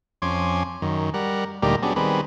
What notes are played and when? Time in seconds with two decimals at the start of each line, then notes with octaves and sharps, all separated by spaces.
0.22 F2 C#4 G#5 C6 D6
0.82 F#2 D#3
1.14 G3 A#4 F#5
1.62 D2 A#2 G3 D#4 G4 A#4
1.83 F#3 B3 C#4 D4 G4 G#4
1.96 D#3 G3 B3 C4 G#4 B4